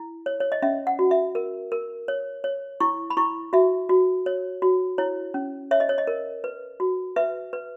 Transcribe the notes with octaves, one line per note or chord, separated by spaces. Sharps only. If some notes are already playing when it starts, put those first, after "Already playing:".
Already playing: E4
C#5
C#5
D#5
C#4 E5
F#5
F#4
E5
A#4
A#4
C#5
C#5
E4 C#6
B5
E4 C#6
F#4 E5
F#4
C#5
F#4
E4 C#5
C#4
C#5 E5
D#5
C#5
D#5
A#4
B4
F#4
B4 E5
B4